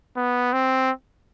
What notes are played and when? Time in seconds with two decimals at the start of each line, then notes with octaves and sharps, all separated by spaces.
0.17 B3
0.53 C4